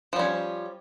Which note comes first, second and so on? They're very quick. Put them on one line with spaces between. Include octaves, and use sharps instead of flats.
F3 G3 C#4